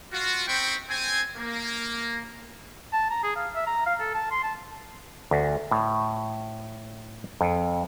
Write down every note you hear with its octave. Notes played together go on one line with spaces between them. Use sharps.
F4 F#4
C4 D#4 C5 G5 B5 C#6
C4 G#5
A#3
A5
A#5
G#4
F5
E5
A#5
F5
A4
A5
C6
A5
D2
A2
F2